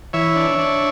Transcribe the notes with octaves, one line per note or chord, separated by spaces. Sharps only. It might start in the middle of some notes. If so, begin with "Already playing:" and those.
E3 C#5 E5
D4
D4